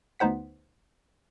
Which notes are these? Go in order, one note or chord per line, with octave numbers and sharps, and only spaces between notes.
D2 B3 D#4 C5 F#5 B6